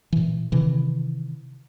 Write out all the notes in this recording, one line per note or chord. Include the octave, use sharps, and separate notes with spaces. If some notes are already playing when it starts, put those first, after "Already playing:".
A#2 E3
C3 D#3 E3